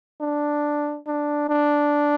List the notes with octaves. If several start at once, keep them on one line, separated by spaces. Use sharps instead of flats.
D4
D4
D4